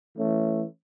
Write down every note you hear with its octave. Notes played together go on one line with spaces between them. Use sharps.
E3 A3 C#4